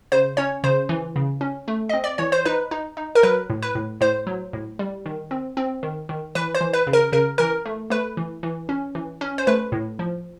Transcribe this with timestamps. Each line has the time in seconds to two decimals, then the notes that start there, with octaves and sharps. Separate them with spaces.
0.12 C#3 C5
0.37 C#4 C#5
0.64 C#3 C5
0.89 E3
1.16 C#3
1.41 C#4
1.68 A3
1.89 C4 D#5
2.04 D5
2.18 E3 C#5
2.32 C5
2.45 D#4 B4
2.71 D#4
2.97 D#4
3.15 A#4
3.23 F#3 B4
3.50 A2
3.63 B4
3.75 A2
4.01 A2 C5
4.27 F#3
4.53 A2
4.79 G3
5.06 D#3
5.31 C4
5.57 C4
5.83 D#3
6.09 D#3
6.35 E3 B4
6.55 C5
6.61 E3
6.73 B4
6.87 C#3
6.93 A#4
7.12 C#3 A#4
7.38 E3 A#4
7.66 A3
7.90 A3 B4
8.17 E3
8.43 E3
8.69 C#4
8.95 E3
9.21 C#4
9.38 C5
9.47 A3 B4
9.72 A2
9.99 F3